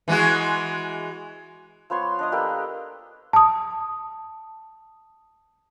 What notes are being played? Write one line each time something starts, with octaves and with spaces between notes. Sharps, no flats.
E3 G#3 F#4
F3 B3 C#5 C6
D4 D#5 D#6
A#3 G4 A4 B4
A5 D#6